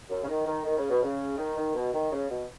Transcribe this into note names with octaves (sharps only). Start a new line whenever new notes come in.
F#2
C#3
D#3
D#3
D#3
C#3
B2
C#3
D#3
D#3
B2
D#3
C#3
B2